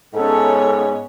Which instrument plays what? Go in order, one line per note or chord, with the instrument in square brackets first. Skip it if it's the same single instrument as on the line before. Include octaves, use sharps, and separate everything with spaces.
[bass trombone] G#2 [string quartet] B3 C#4 C#5 [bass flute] A4